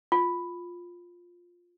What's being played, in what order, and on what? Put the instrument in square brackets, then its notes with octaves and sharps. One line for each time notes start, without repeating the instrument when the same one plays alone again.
[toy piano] F4